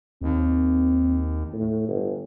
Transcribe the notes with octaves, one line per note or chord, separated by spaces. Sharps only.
D#2 C4
A2
G1